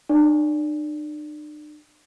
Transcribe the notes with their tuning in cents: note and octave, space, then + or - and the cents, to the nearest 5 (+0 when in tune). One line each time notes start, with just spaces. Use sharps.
D4 +45 D5 -25